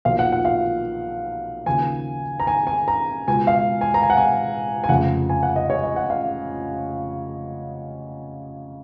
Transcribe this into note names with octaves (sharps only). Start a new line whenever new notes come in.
B1 A#2 F3 F5
F#5
F#5
F5
D#2 C#3 F3 G#5
A#5
G#5
G#5
A#5
C#2 B2 G#5
F5
G#5
A#5
G#5
F#5
G#5
G#5
F1 F2 C#3 F#5
G#5
F#5
D#5
C#5
D#5
F#5
F5